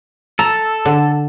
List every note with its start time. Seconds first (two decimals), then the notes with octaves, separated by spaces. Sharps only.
0.39 A4 A#5
0.86 D3